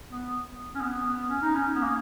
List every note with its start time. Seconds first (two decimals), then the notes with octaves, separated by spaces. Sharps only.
0.10 B3
0.75 C#4
0.81 B3
1.04 B3
1.29 C#4
1.42 D#4
1.55 C#4
1.75 B3
1.82 A#3